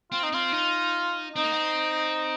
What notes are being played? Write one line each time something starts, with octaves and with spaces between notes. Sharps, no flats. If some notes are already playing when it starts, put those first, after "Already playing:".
C4 F4
D#4
C4 F4
D#4
C4 D#4
A#3
C4